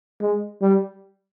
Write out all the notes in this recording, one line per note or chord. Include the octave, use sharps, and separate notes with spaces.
G#3
G3